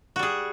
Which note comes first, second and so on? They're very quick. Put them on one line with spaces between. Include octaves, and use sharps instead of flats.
F#4 G3 G#4